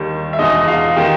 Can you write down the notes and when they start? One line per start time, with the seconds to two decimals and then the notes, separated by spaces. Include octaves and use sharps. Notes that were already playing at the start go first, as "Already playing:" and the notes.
Already playing: D#2 D#3 G3
0.33 E5
0.39 E2 B2 G#3 D#4 D#5
0.67 F4 F5
0.96 D#3 G#3 G4 G5